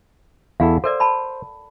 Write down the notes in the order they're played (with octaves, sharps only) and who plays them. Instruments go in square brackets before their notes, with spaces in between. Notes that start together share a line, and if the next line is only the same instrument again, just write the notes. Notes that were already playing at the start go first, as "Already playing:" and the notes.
[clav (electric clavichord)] E2 E4 A4 [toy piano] F5 F#5
[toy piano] A4 A#4 D5 [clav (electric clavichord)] C5
[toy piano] A5 B5